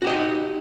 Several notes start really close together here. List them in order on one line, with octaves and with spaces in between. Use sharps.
F#4 G4 D#5 D#4